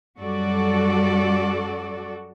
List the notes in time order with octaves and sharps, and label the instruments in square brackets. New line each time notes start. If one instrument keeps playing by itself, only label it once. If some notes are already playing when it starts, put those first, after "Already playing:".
[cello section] F#2 G3 F#4 A4 D5